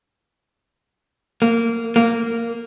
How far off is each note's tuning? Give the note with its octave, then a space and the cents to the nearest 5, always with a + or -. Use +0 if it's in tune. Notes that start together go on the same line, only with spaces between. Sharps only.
A#3 -15
A#3 -10